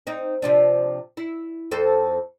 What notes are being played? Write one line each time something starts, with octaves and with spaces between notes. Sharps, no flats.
C4 D#4
C3 F3 D4
E4
F2 A4 C5